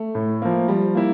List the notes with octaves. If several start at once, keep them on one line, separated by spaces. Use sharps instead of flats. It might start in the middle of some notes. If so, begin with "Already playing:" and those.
Already playing: A3
A2
F3 A#3
F3 G3
A#3 E4